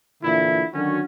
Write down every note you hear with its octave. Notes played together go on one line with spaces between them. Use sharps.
A#2 D3 E3 E4
D3 D#3 F#3 C#4 F#4